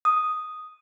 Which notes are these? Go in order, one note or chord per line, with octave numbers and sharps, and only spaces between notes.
D#6